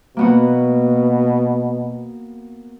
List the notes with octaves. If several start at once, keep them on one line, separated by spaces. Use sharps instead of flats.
B2 A#3 B3 F#4